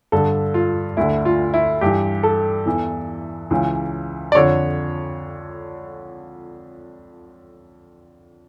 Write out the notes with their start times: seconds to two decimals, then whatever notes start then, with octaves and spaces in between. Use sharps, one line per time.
0.12 G2 D3 A4
0.54 F4
0.97 D2 D3 E4
1.25 F4
1.54 E4
1.81 G2 E3 G4
2.23 A4
2.66 E2 E3
3.50 C#2 C#3 E3
4.32 D5
4.35 F2 D3 C#5